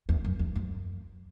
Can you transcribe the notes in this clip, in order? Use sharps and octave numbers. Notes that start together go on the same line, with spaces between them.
E2
F#2
E2
F#2